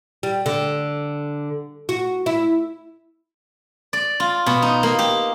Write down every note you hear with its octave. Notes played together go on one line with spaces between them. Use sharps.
G3
D3
F#4
E4
D5
F4
B2
D#4
A#3
G4